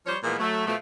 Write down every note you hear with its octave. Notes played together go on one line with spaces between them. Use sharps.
F3 G3 C5 C#5
A#2 E3 F3 G#3 B3 A#4
F#3 A3
B2 F3 A3